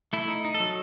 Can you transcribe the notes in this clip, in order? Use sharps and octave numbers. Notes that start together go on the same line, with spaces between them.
A3 E4
D#4
D#4
A4
F#3